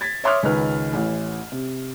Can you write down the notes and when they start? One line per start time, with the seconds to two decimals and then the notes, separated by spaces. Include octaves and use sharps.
0.01 G#6 A6 B6
0.24 C#5 E5 C6 D6 D#6 F6
0.43 C#2 D#3 B4 F6
0.93 A1 E3
1.52 C3